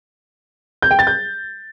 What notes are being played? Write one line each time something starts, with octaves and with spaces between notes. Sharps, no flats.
G6
G5
A6
G6